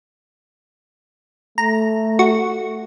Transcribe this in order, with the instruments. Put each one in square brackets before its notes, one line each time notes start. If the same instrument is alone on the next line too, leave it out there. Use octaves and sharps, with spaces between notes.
[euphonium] A3 [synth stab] A#5
[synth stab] F#4 C#6